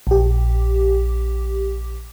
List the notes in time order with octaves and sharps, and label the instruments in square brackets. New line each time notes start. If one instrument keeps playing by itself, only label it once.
[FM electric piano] A#1 G4